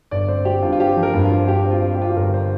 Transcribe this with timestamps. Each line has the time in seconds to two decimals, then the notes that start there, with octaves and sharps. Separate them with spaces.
0.11 G1 D5
0.28 C4 C5
0.45 C4 G4
0.62 G2 F4
0.73 F4
0.80 C4 G4
0.97 F3
1.03 A#4
1.14 G2
1.25 F4
1.32 F3
1.48 G2 G4
1.65 C4
1.71 F4
1.82 C4
1.94 G4
1.99 C4 F4
2.09 G4
2.16 G1 A#4
2.34 C5